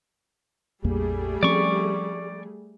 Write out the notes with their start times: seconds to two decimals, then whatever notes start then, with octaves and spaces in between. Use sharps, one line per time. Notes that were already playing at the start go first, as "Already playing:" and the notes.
0.84 A#1 F2 G3 A3 A#3 G#4
1.43 F3 C4 C#4 D5 C#6